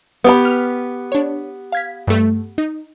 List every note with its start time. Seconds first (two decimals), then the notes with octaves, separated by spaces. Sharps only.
0.24 B3 G4 B5
0.45 F6
1.12 D4 C#5
1.72 F5 G#6 B6
2.07 G2 A3
2.58 D#4